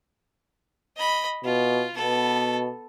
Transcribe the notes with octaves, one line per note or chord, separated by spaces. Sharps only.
D#5 B5
B2 F4
B2 B3 A4